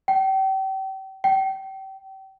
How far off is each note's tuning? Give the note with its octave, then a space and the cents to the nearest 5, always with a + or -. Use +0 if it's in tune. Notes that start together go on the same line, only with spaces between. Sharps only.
G5 -35
G5 -30